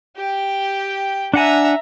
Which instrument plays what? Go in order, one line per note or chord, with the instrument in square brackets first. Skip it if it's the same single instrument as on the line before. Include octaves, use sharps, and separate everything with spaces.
[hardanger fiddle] G4 G5
[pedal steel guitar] D4 F#5 G#5 [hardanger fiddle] E5 A#5